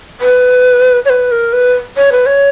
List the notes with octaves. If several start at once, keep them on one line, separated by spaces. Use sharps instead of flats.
B4
C#5
B4
A#4
B4
C#5
B4
C#5